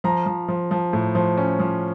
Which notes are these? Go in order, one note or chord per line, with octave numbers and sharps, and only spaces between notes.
F3 A#5
F3
F3
F3
A2
F3
C#4
F3